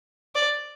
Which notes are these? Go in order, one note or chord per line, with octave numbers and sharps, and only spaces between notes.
D5